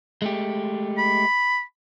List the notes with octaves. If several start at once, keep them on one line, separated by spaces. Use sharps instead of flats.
G#3 A3 G4
B5